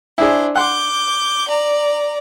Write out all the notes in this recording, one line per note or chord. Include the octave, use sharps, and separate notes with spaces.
D4 E4 G#4 C5
F#5 C6 D6 G6
D5 A#5